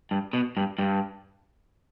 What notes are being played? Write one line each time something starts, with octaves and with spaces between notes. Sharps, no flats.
G2
B2
G2
G2